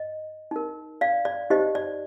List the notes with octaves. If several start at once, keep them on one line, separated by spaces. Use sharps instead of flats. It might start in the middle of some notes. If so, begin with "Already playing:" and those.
Already playing: D#5
D#4 A#4
D5 F5
D5
D#4 G4 C5 D#5
D5